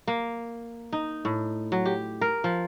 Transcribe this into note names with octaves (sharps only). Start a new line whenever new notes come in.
A#3
D#4
A2
F#3
G4
A#4
F3